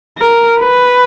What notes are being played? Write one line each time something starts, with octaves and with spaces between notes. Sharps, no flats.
A#4
B4